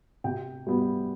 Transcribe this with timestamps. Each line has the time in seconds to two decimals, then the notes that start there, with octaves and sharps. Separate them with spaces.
0.24 C3 G5
0.67 G3 B3